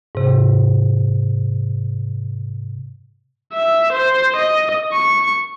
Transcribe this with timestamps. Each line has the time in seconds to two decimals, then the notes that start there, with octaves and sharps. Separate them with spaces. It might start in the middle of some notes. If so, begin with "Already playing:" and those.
0.15 G#2 C3
3.54 E5
3.92 C5
4.36 D#5
4.92 C#6